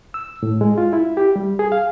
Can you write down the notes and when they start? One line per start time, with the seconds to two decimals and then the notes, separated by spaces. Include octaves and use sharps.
0.14 E6
0.43 A2
0.61 G#3
0.78 F4
0.93 E4
1.17 G4
1.36 G3
1.59 G#4
1.72 F5